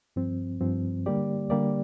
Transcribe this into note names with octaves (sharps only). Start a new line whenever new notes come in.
G2 F3 C4
G2 F3 C4
D3 G3 A#3 G4 D5
D3 G3 A#3 G4 D5